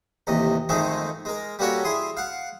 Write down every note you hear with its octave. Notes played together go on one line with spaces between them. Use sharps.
A1 D#2 C3 D#5
F2 D#3 G#3 A3 C4 G#4
G#3 A#4
G3 A#3 C#4 F#4 A4 C#5
E4 G#4 C6 D#6
F5 F#5